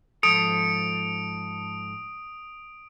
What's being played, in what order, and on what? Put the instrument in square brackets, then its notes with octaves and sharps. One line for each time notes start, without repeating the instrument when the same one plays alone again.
[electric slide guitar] G#2 F3 A4 [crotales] D#6 D7